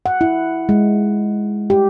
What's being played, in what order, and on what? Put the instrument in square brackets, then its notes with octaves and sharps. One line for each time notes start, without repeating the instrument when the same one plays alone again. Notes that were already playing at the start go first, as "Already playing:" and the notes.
[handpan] F#5
E4
G#3
G4